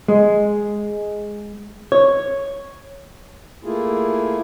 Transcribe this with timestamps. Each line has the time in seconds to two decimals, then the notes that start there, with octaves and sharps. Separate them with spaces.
0.08 G#3
1.92 C#5
3.64 A3 A#3 E4 F4 G#4